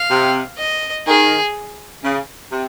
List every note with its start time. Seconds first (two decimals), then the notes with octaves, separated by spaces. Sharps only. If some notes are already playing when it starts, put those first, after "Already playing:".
Already playing: F5
0.10 C3
0.58 D#5
1.07 D#3 G#4
2.03 C#3
2.51 C3